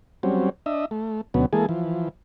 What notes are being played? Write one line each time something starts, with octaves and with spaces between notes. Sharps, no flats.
F#3 G3 C4 C#4
D4 D#5 E5
A3
D2 B2 F#3 B3 C#4
E3 G#3 A#3 G#4 A4
E3 F3